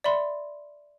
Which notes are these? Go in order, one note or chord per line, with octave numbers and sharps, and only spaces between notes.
D5 E5 B5 C6